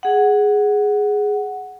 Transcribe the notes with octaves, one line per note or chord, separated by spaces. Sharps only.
G#4 F#5